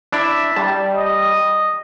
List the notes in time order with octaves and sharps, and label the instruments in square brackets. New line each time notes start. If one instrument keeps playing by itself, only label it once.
[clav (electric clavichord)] D4 E4 D5 [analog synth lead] E5
[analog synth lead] G3 [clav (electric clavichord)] A5
[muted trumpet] D#5